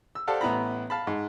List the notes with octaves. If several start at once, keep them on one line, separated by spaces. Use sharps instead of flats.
E6
G4 A4 C5 D5 F5 F#5
A1 B3 E4 A#5 B5
F5 A5 B5
G#2